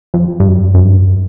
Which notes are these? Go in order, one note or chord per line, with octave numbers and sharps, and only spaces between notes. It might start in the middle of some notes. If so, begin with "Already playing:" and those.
F2
G2
F#2
F#2
G2